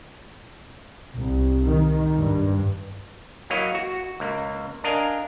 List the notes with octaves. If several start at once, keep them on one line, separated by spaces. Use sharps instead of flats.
C2
D#3
G2
F#3 A#3 E4 C#5 D#5 F5
F#4
C#2 A#3
D4 A#4 D#5 F5 G#5